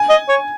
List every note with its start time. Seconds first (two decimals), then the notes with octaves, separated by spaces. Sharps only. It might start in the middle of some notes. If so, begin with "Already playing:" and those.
Already playing: G#5
0.09 D#5
0.29 C#5